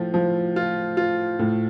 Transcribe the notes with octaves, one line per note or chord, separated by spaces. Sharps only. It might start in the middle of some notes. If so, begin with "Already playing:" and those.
Already playing: A2 F3 F4
F3
F4
F4
A2